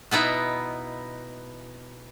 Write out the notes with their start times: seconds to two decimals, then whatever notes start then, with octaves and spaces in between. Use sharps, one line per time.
0.11 B2 B3 D#4 E4